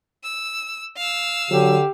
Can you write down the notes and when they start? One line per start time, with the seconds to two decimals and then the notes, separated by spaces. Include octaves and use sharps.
0.24 E6
0.97 F5 E6
1.50 D3 F#3 G4